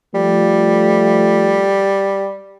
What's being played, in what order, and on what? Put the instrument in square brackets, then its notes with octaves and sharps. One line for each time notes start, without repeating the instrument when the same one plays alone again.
[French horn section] F3 A3 [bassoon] G3